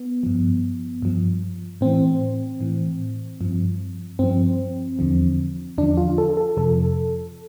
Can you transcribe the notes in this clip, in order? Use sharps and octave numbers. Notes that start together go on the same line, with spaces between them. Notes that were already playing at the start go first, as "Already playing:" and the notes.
Already playing: B3
G2 F3
G2 F3
A2 E3 C4
A2 E3
G2 F3
G2 F3 C4
E2 D3 F3
E2 D3 F3 D4
F4
A4
A4
F2 C3 F3 A4